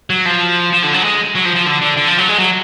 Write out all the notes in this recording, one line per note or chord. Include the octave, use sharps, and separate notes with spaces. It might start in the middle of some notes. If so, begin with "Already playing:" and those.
F#3
F3
F3
D3
F#3
G#3
F#3
F3
F3
D3
D3
D3
F3
F#3
G#3
F#3